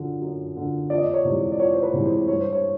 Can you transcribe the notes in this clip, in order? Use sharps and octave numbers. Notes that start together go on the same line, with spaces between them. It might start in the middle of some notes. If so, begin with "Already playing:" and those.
Already playing: F#2 D3 F3
F#2
D3 F3
F2 D5
D#5
D5
C#5
C3 E3 G#3
D5
F2 C#5
C5
B4
C3 E3 G#3
C5
G2 C#5
C5
C#5